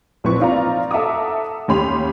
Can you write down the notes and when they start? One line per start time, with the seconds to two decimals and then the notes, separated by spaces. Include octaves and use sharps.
0.24 A#1 F3 C4 E4 B4 C#6
0.40 C4 D#4 F4 D5 F5 A#5
0.91 A4 E5 F#5 A#5 D6 D#6
1.68 D#2 C#4 G4 B5 C6 F7